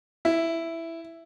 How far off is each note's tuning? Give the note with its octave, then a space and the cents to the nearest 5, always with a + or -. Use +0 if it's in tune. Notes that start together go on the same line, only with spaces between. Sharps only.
E4 +5